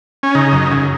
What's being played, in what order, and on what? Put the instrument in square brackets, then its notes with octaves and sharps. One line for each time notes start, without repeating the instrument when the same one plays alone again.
[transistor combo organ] C#4
C#3 D#4
F#2
C#3